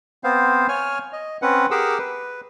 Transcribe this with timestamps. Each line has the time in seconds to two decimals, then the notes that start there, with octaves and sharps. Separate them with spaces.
0.24 B3 C4 C5 F5
0.68 C#5 G#5 F6
1.13 D#5
1.42 C4 C#4 B4 F#5
1.71 G4 G#4 A#4 F#5 D6 E6
1.98 B4